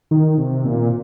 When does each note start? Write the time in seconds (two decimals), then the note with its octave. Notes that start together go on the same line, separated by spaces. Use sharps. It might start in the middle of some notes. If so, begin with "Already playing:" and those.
0.11 D#3
0.38 C3
0.65 A#2